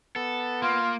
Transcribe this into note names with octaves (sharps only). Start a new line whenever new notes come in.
B3 A4
A#3 F4